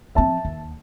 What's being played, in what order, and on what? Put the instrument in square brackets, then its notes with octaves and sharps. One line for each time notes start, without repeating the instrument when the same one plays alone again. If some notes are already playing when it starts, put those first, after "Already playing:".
[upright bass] F3 C4 [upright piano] E5 A5
[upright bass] D#2